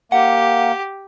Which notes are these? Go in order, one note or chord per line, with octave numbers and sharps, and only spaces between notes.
A#3 G4 F#5